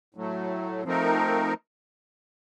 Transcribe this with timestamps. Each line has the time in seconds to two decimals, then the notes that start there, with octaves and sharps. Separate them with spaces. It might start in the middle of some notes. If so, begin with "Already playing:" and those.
0.15 A2 F#3 A3
0.84 F3 A3 C4 D#4 A#4